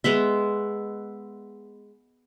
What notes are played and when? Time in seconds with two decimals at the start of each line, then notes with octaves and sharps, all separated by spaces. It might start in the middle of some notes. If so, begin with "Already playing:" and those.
0.04 G#3 B3 E5